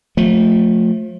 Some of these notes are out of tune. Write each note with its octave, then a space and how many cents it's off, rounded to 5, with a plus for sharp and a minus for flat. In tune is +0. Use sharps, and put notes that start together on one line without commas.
F3 +35 A3 +0